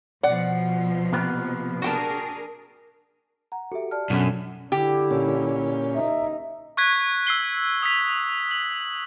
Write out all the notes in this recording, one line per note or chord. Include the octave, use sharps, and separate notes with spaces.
B2 F3 D5 F#5
C3 A#3 B3
D4 F#4 G#4 A#4 G5 A5
F#5 A#5
F#4 G4 A4 E5
D5 A5 F6
F#2 B2 C#4 D4 A4 F#5 B6
D3 E4 G4
A#2 C#4
D#4 E5
C#6 F#6 G#6 B6
E6 C7 G7
D#6 E6 B6
F#7